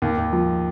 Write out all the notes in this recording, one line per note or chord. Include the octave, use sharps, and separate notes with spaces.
D#2
D#2
F3